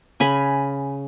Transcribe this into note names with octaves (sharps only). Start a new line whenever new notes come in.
C#3 G#5 B5